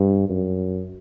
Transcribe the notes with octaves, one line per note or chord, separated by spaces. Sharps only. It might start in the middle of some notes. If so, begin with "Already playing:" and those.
Already playing: G2
F#2